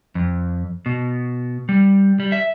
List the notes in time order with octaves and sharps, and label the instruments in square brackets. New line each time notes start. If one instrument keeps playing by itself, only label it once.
[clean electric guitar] F2
B2
G3
G3
E5